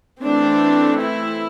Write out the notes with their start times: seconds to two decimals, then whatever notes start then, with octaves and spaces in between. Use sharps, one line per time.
0.22 E3 A3 C4 D4
0.98 E4